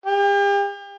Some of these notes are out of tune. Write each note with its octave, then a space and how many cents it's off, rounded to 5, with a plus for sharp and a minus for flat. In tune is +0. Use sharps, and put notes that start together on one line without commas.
G4 +40